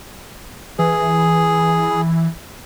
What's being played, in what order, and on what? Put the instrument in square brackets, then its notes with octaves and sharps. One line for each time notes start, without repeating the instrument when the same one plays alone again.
[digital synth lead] E3 [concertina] G#4